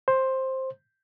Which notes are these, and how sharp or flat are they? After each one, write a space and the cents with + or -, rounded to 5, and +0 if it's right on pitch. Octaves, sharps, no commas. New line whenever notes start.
C5 +10